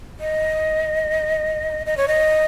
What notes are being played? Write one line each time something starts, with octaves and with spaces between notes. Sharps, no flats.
D#5
D#5
C#5
D#5